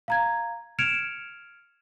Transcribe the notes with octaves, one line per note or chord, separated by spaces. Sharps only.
F5 A#5 G#6
F6 G#6 C#7 D7 E7 F7